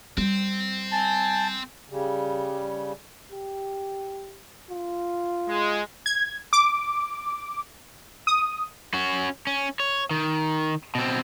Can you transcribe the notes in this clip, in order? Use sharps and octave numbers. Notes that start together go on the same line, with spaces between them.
G3 C4
G#5 A5
C#3 G3
G4
F4
G#3
G#6
D6
D#6
C#4 F#4
C#4
C#5
D#3
B2 C4